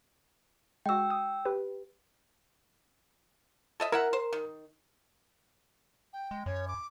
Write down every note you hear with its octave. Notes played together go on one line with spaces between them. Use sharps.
G#3 F#4 G5 E6
D#6
G4 B4
A4 D#5 E5
E4 A#4 E5 F#5
C5
D#3
G5
G#3
F#2 C#5
D6